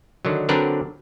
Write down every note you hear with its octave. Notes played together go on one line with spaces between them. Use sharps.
D3 D#3 F#3
D3 F#3 C4 D4 A#4 B4